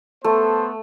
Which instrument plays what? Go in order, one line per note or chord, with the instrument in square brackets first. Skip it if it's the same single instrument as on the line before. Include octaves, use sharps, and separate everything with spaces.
[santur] A3 [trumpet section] B3 A4 C5